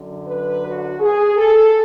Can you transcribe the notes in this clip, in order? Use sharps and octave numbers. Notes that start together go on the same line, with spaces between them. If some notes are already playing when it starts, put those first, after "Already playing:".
Already playing: F#2 D3 F#3
B4
F#4
G#4
A4